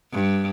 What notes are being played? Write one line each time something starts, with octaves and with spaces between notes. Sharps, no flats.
G2